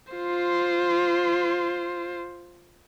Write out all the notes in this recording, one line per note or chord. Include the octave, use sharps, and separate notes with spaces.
F4 C5